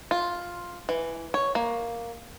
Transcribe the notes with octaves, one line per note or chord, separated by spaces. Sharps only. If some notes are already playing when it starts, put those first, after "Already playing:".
F4
E3
C#5
A#3